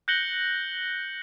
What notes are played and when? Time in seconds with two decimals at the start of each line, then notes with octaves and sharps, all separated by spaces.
0.08 F#6 G6 A#6 C#7 F#7 G7